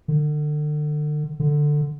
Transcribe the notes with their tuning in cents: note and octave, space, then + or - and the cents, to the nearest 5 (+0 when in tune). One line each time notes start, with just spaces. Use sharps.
D3 +35
D3 +10